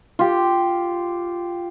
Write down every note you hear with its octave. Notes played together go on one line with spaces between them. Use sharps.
F4 G4